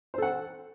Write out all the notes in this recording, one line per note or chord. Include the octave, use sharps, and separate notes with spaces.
A4 C5 F#5